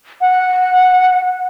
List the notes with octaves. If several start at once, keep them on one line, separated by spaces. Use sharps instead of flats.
F#5